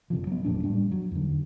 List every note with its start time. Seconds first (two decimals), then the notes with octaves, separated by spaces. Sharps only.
0.10 F#1 C3 F3
0.27 F#3 B3
0.45 G#1 F2 A#2 D4
0.63 A2 G3 D4
0.92 F#3
1.11 E2 D3